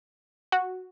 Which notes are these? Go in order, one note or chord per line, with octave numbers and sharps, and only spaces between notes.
F#4